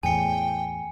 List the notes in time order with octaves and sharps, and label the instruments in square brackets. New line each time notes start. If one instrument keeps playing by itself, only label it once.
[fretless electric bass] E2 A2 [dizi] G5 [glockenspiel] G#5 C#7